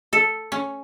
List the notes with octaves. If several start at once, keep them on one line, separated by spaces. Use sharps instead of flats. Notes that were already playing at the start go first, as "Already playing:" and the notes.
A4
C#4